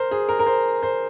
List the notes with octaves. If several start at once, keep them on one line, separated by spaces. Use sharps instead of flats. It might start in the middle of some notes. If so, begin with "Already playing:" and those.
Already playing: A#4 C5
G#4
A#4
A#4
C5
C5